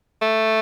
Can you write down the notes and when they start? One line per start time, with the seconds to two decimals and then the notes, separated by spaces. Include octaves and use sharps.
0.22 A3